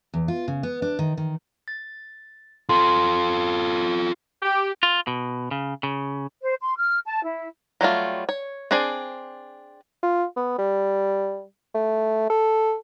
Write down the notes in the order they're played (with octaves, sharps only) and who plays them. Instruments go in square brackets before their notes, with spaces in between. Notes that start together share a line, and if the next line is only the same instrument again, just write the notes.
[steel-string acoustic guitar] E2
F4
C#3
B3
D4
D#3
D#3
[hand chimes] A6
[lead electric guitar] F4 A4 [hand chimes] C6
[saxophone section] G4
[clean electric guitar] F4
B2
C#3
C#3
[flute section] C5
C6
F6
A5
E4
[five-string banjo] F#3 G3 A3 F4
C#5
C4 D4 G#4 D5 G#5
[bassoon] F4
B3
G3
A3
A4